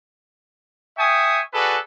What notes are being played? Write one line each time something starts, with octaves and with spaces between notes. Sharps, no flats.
E5 G5 G#5 C#6 D#6
F#4 G#4 A4 B4 D5